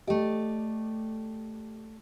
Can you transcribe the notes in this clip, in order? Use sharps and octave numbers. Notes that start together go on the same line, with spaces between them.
A3 G4 D5 D#5